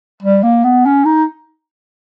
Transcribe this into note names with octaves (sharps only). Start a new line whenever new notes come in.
G3
A#3
B3
C#4
D#4